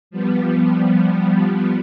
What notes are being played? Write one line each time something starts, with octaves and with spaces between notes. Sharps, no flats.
F3 G3 B3